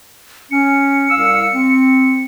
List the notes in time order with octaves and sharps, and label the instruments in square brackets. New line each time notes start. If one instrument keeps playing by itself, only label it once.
[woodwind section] C#4 [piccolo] C#7
[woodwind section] C2 F5 E6
C4